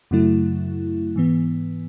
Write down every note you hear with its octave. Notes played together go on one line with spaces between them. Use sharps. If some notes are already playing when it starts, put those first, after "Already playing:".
F#2 C#3 F#3 A3 E4
G#2 E3 B3